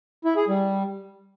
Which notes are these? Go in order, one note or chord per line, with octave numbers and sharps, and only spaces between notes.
E4
G#4
G3